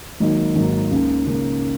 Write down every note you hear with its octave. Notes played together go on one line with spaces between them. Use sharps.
G#1 G#2 F#3 A#3 D#4
G#1 G#2 F#3 A#3 D#4
C#2 C#3 A#3
C#2 C#3 A#3